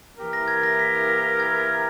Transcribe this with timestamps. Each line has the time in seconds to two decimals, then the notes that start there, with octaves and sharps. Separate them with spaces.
0.17 E3 A#3 E4 G4 A#4
0.33 A#6
0.48 G#6
0.63 A#6
0.79 B6
1.09 A#6
1.40 G#6
1.61 G#6